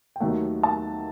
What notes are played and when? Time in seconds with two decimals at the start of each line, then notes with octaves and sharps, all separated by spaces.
0.16 G5
0.20 D#2 D#3 F#3 A3 F#5
0.63 A5